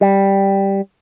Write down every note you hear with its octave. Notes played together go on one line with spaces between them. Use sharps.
G3